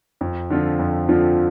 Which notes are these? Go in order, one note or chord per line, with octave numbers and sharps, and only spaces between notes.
F2
D3 F3 C4 F4
F2
D3 F3 C4 F4